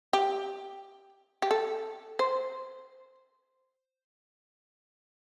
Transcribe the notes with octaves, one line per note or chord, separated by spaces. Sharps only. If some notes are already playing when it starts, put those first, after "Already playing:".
G4
G4
A4
C5